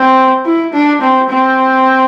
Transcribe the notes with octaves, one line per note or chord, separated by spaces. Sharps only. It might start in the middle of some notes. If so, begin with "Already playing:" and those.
Already playing: C4
E4
D4
C4
C4